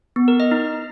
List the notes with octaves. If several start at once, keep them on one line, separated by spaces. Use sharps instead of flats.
B3
A#4
D#5
D#4